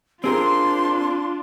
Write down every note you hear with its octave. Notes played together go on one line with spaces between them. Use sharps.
C4 D4 F4 G#4 A#4 C6